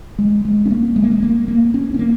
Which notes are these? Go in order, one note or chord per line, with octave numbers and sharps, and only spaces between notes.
G#3
G#3
C#4
A#3
G#3
A#3
G#3
A#3
A#3
C#4
C#4
A#3